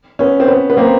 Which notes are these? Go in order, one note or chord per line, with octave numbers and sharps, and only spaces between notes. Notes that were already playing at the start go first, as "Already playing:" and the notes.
B3 C#4
C4
B3 C#4
B3
A#3 C4